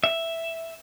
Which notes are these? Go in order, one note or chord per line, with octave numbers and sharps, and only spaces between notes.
E5